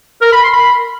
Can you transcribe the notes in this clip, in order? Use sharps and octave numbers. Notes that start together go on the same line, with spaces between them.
A#4
B5
C6
B5